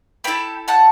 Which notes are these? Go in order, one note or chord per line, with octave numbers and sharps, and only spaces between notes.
B3 E4 A4 G5 B5
F#5 A5